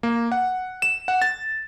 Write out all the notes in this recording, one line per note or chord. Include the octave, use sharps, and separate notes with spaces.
A#3
F#5
E7
F#5
A6